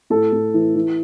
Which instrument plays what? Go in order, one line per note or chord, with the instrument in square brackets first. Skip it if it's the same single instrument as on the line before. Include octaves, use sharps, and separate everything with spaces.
[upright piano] A2 A4
A2
E3
E3